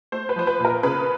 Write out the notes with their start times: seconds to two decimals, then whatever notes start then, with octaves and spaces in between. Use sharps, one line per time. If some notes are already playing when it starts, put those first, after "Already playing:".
0.12 A3 C5
0.29 B4
0.36 F3 C5
0.47 B4
0.60 A#2
0.65 A#4
0.83 C#3 B4